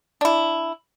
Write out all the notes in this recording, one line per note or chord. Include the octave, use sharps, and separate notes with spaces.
D4 E4